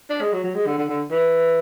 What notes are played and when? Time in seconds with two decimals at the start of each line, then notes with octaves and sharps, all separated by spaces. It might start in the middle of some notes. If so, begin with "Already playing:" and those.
0.10 D4
0.21 G#3
0.33 F#3
0.44 F#3
0.55 G#3
0.67 D3
0.78 D3
0.89 D3
1.11 E3